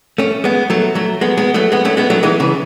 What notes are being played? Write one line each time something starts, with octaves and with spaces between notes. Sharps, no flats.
A3 C#4
G#3 B3
F#3 A3
F#3 A3
G#3 B3
G#3 B3
F#3 A3
G#3 B3
A3 C#4
G#3 B3
F#3 A3
E3 G#3
C#3 E3